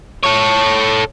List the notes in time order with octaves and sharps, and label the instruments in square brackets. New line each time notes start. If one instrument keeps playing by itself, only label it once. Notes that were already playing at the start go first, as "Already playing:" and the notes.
[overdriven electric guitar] A4 C#5